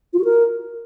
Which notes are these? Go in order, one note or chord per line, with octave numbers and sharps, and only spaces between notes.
F4
F#4
A#4